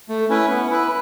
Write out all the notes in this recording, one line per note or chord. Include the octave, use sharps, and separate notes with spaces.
A3
C#4 E4 B4
B3
E4 B4